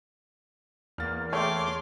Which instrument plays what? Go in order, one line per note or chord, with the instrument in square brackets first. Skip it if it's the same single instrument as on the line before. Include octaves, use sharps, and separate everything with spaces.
[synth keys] E2 A#3 [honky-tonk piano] F6 A6
[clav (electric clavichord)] A3 G5 [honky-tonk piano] G#4 C#5 [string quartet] C6 D6